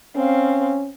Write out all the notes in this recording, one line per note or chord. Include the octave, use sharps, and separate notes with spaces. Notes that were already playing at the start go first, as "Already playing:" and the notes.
C4 C#4 F5